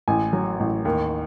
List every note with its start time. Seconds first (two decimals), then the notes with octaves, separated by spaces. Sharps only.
0.08 A1 G#5
0.33 F#3
0.60 A1
0.85 D#2